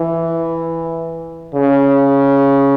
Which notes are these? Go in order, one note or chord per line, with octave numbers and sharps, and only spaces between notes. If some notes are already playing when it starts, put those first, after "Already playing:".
Already playing: E3
C#3